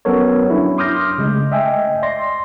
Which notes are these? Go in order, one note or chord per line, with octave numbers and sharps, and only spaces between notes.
F#3 B3 C#4 A4 A#4 C#5
F#3 C#4 D4 E4
C6 D6 D#6 F6 G6 A#6
C#3 G#3 A3
D#5 E5 G5 G#5
D5 C6 A#6